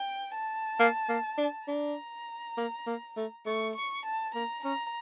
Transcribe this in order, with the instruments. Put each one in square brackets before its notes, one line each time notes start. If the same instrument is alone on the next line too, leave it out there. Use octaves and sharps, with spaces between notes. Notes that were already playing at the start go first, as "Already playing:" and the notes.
Already playing: [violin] G5
A5
[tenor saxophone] A#3
A#3
D4
[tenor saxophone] D4 [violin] A#5
[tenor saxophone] A#3
A#3
A3
[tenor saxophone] A3 [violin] C#6
[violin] C#6
A5
[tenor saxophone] A#3 [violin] A#5
[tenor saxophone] C#4 [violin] A#5